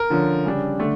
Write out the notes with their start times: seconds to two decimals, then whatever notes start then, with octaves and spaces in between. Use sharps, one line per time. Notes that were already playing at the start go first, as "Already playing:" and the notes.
Already playing: A#4
0.10 D3 F3 C#4
0.45 C#3 G3 D4
0.79 D3 A3 D4